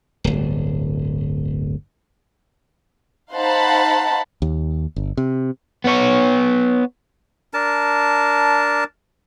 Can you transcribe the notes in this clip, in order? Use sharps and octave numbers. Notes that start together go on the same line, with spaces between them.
D1 G1
D#4 C5 F5 F#5 A5 B5
D#2
G1
C3
B3 C#5
D4 A#4 A5